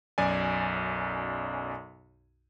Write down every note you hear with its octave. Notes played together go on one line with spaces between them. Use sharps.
B1 F#2 D5 G#5